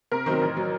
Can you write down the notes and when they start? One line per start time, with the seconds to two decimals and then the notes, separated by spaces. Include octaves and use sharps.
0.12 C3 A#4
0.26 D#3 F#3 C4 C5
0.41 A1
0.57 F#3